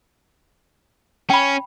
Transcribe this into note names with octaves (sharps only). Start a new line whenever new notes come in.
C#4 G5 B5